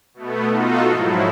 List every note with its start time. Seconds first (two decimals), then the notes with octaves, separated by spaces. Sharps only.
0.14 B2 A3 B3
0.48 D#4 F4 F#4 A4
0.89 G#2 F3 F#3 E4